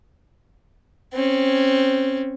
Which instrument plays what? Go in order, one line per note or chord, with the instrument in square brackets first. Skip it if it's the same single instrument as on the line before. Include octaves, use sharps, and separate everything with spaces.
[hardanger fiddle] C4 C#4